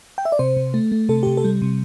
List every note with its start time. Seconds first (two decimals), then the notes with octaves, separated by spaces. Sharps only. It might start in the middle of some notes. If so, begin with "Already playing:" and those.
0.18 G5
0.25 E5
0.32 D5
0.39 C3 C5
0.57 C3
0.74 A3
0.92 A3
1.09 C3 A4
1.23 C3 G4
1.37 A4
1.44 G3
1.62 C3